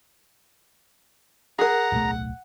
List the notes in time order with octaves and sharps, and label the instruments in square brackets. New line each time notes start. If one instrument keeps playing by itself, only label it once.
[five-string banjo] G#4 A#4 [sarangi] F#5 [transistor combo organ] A#5
[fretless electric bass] D1 B1 A3